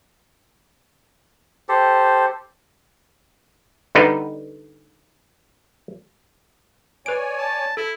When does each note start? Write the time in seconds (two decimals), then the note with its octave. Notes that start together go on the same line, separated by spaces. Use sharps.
1.69 G4 A4 C5
3.95 D3 G3 B3 D#4 B4
7.06 B4 C#5 D5 G#5 D7
7.38 A5
7.77 E4 A4